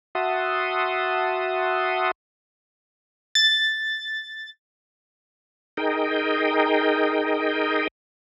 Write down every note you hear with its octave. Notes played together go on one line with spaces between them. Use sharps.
F#4 E5 F#5 A5 C6 D#6
A6
D#4 G#4 A#4 D#5 G5